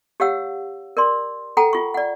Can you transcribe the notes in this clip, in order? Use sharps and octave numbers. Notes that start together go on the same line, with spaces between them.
G4 C#5 F5 F#5 E6
A#4 D5 C6
A4 F#5 G5 A#5
F4 C#6
D5 F#5